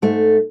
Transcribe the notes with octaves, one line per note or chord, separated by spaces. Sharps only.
G#2 A3